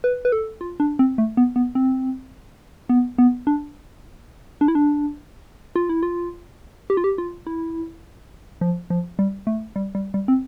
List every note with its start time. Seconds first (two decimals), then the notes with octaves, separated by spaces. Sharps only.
0.04 B4
0.25 B4
0.32 A4
0.61 F4
0.80 D4
0.99 C4
1.18 A3
1.37 B3
1.56 B3
1.75 C4
2.89 B3
3.18 B3
3.47 D4
4.61 D4
4.68 E4
4.75 D4
5.76 F4
5.89 E4
6.03 F4
6.90 G4
6.97 F4
7.04 G4
7.18 F4
7.47 E4
8.61 F3
8.90 F3
9.19 G3
9.47 A3
9.76 G3
9.95 G3
10.14 G3
10.28 C4